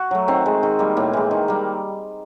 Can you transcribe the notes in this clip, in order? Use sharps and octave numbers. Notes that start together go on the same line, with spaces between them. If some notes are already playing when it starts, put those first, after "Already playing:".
Already playing: F#4
F#3 A3
D#3 C4
G#3
D#3
G3 A#3
A2 A#3
E3 G#3
D#3
G3 A#3